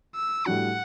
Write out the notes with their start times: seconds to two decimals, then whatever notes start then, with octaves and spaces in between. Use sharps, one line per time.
0.15 E6
0.46 A2 G3 D4 F#4 F#5